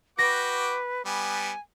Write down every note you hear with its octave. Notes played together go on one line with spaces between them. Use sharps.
F#4 B4 G5 D6 A#6
G3 B3 G#5